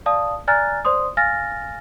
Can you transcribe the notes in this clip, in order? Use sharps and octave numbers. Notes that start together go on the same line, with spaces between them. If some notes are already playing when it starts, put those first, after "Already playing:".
D5 F5 A5 D#6
D5 G#5 A#5 F6 F#6 A6
C5 D5 C6 D#6
F5 G#5 F6 A6 A#6